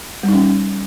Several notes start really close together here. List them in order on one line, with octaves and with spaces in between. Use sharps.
G3 D#4 C#4